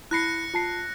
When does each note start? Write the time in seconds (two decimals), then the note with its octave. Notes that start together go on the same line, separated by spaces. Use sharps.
0.11 E4 B5 F#6 A#6 C7 C#7
0.54 F4 A5 C7